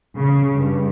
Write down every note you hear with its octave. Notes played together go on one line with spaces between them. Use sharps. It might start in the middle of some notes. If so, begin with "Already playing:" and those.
C#3
G2